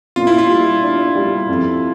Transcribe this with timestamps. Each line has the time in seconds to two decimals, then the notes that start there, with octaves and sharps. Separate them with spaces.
0.16 A#2 F4
0.27 E4
0.38 F4
0.49 G3
0.83 D4
1.15 G3
1.48 F2